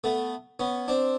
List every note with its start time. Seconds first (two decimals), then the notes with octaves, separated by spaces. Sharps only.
0.04 A3 B3
0.60 B3 C#4
0.88 C4 D4